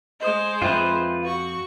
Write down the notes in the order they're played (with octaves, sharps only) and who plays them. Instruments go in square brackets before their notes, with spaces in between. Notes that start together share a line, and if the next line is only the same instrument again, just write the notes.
[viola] G#3 C5 [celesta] D#5 D#6
[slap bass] F2 [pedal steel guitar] F4 B4 [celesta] E5 G5
[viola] F#4 C#6 [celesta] F5